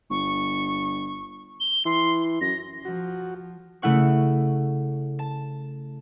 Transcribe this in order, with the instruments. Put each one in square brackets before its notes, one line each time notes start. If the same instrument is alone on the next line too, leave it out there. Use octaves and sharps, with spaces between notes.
[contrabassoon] G1 [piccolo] C#6
[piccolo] G7
[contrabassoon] E3 [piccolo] C6
[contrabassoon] F#2 [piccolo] A#6
[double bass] F3 [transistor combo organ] F#4
[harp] C#3 A3 E4 F#5 C#6
A5